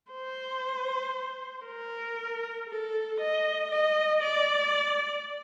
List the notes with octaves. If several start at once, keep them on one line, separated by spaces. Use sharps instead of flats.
C5
A#4
A4
D#5
D#5
D5